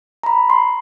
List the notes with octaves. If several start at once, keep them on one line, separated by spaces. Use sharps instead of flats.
A#5 B5
C6